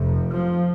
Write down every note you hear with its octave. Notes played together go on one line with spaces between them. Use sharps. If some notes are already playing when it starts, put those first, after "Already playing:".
Already playing: F1 F2 C3
F3